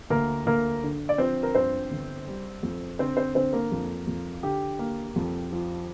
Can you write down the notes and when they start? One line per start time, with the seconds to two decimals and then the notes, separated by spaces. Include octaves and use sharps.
0.10 D2 A#3 A#4
0.46 D2 A#3 A#4
0.83 D3
1.09 D5
1.18 F3 C4 C5
1.43 A#4
1.55 G2 C4 C5
1.91 G1
2.28 G3
2.63 F2
2.99 D3 C4 C5
3.17 C4 C5
3.35 D3 C4 C5
3.53 A#3 A#4
3.72 F2
4.07 F2
4.43 D3 G4
4.79 A#3
5.16 F2
5.52 F3